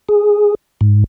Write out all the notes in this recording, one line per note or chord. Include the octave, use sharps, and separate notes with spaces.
G#4
G#2